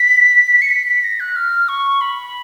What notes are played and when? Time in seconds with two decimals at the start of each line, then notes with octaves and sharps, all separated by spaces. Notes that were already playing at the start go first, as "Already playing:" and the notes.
Already playing: B6
0.62 C#7
0.71 B6
0.87 B6
1.04 A#6
1.20 F#6
1.36 F6
1.68 C#6
2.01 B5